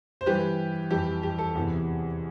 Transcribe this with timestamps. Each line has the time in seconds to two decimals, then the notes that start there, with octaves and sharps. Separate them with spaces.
0.21 C5
0.26 G2 E3 G3 G4 B4
0.91 F2 E3 G3 G4
1.23 G4
1.39 A4
1.55 E2 C3 E3